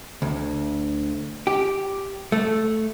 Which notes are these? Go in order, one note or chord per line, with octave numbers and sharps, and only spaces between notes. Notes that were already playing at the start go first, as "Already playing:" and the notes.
D2
G4
A3